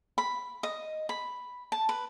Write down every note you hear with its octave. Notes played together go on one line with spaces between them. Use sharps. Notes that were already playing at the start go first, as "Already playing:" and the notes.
B5
D#5
B5
A5
B4